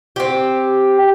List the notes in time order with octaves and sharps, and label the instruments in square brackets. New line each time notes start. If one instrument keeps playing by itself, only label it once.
[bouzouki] C4 G4